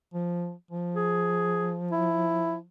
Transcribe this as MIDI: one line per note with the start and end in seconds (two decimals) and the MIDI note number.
0.14 0.53 53
0.71 2.65 53
0.96 1.75 68
1.92 2.56 64